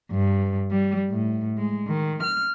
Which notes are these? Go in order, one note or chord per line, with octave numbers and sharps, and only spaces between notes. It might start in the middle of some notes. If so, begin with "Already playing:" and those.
G2
G3
A2
G#3
D#3
F6